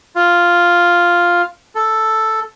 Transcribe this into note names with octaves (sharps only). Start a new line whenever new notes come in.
F4
A4